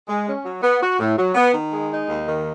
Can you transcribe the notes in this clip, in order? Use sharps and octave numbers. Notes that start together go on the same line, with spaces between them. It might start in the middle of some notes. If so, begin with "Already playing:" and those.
G#3
C#4
F#3
B3
F#4
A2
F#3
B3
D#3
G#3
D#4
D#2
D#3